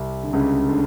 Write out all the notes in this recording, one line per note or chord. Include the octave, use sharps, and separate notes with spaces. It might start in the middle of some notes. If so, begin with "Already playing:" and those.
Already playing: C2 C3
D3
C#2 C#3
D3